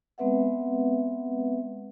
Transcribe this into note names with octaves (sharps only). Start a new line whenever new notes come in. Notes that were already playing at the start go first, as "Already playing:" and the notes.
G#3 B3 C4 B4 E5 F#5